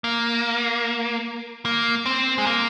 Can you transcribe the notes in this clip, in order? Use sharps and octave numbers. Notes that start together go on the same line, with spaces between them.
A#3
A#3
C4
G#3
A#3